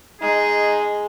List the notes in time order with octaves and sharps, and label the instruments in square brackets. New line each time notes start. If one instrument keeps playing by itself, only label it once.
[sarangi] G#3 [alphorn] D#4 [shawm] G#4